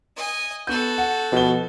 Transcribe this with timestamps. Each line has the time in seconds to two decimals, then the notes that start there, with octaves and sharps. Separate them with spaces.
0.17 D#5 G#5
0.67 B3 F#4 A4 G6
0.98 F#5
1.32 B2 F3 G7